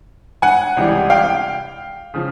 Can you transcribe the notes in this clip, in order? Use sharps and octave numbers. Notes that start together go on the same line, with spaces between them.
F#5 G#5
C#2 C3 E3 G3
F5 G5
C#3 F3